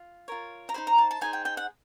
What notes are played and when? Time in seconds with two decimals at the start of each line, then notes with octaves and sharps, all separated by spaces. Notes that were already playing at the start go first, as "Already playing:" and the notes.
Already playing: F4
0.28 F4 A#4 C#5
0.69 A#5
0.74 D#4 G#4 C5 B5
0.87 A#5
0.98 A5
1.11 A5
1.21 D#4 G#4 C5 G#5
1.33 G5
1.45 G5
1.57 F#5